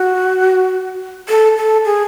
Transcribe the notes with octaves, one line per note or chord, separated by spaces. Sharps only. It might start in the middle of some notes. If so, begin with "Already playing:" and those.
Already playing: F#4
A4
A4
G#4